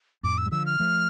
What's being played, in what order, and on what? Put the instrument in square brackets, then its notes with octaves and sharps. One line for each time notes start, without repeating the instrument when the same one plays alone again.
[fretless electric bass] F2 A2 [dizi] D6
[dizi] E6
[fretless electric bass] G3
[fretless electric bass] D3 F3 [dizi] E6
[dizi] F6
[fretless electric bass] F3 A3